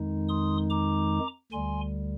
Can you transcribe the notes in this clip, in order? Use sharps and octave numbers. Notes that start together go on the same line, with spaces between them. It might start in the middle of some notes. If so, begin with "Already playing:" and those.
Already playing: F2 D#3 G#3 D#4
C6 D#6
A#5 D6
D2 D3 G3 G#5 C6